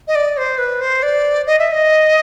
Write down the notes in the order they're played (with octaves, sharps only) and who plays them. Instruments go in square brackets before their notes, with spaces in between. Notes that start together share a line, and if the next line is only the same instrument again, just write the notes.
[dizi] D#5
D5
C5
B4
C5
D5
D#5
E5
D#5